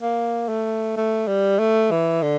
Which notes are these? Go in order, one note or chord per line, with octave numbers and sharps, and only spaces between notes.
A#3
A3
A3
G3
A3
E3
D3